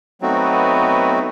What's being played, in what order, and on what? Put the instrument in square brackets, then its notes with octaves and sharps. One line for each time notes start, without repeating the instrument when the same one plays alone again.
[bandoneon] F#3 A3 C4 D#4 F#4 [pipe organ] B3